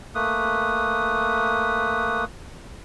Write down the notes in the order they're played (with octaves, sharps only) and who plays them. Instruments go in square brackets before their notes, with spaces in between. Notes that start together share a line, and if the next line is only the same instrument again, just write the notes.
[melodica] A3 A#3 B4 D#6